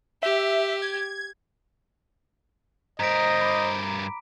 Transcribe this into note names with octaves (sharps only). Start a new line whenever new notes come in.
G4 E5
G#6
G2 A#4 C5 D#5 A#5 B6 D7
B5 D6